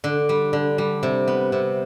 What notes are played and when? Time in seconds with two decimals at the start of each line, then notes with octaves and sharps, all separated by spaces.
0.04 D3
0.29 G3
0.53 D3
0.78 G3
1.03 C3
1.28 B3
1.52 C3